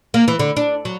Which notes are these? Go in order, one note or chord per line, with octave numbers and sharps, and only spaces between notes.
A#3
E3
D3
D4
F#3